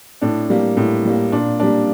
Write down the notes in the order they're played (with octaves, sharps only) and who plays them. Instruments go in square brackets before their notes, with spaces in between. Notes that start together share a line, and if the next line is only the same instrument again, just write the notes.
[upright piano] A2 D4
G3 A#3
A2
G3 A#3
A#2 D4
G3 A#3 D4